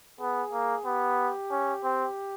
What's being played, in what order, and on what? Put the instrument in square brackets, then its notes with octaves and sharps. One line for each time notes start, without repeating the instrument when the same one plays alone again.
[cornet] B3 [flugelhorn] G#4
[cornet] A#3
[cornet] B3 [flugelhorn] G4
[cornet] C#4
C4